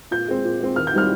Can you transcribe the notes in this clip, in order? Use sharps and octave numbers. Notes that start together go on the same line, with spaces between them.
A#2 G6
G#3 C4
A#2
G#3 C4
D#2 F6
G6
D#3 G3 C4 F6